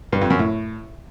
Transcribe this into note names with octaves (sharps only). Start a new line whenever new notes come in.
G2
F2
F#2
A2